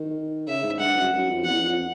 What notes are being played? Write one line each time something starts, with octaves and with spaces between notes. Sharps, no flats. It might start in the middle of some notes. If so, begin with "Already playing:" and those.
Already playing: D#3
C#3 E5
G#2
G2 F#5
F#2
F#2
F2
E2 F#5
F2